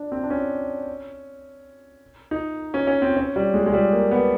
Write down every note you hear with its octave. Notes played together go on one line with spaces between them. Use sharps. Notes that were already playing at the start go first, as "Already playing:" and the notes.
Already playing: D4
C4
D4
C#4
D#4
C#4
C#4
C4
C#4
G3
G#3
G#3
G3
A#3
B3